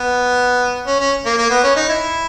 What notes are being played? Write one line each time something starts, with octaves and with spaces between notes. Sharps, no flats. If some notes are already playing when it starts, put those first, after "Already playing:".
Already playing: B3
C#4
C#4
A#3
A#3
B3
C#4
D#4
E4